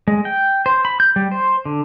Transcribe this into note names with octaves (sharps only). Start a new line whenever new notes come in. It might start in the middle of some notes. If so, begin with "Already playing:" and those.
G#3
G5
C5
B5
G6
G3
C5
D3